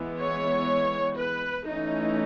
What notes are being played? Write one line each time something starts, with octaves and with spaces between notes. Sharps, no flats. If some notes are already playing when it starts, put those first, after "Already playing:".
Already playing: E3 G#3 B3
C#5
B4
E3 A3 C#4 D#4